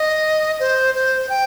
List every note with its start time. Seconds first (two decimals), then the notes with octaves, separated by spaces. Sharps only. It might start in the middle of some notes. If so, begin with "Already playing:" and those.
Already playing: D#5
0.60 C5
0.95 C5
1.29 G5